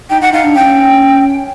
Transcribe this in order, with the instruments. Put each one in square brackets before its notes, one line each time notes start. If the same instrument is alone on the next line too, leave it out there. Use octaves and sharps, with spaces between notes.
[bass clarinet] D#4 [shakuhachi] G5
[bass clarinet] D#4 [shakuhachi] F#5
[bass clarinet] D#4 [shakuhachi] F5
[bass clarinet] D4
[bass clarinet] C#4 [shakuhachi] G5